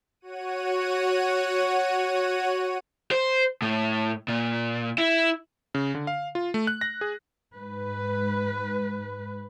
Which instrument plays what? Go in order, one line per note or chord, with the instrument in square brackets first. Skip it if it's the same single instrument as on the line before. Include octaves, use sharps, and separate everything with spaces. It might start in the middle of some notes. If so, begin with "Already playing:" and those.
[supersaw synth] F#4 C#5 F#5 D#7
[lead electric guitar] C5
A2
A#2
E4
[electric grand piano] C#3
D3
F5
F4
A3
F#6
A#6
G#4
[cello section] G#2 B4